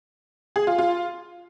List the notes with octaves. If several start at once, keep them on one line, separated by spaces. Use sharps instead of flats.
G#4
F4
F4